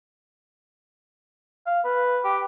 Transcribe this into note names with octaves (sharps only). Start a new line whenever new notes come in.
F5
B4
G4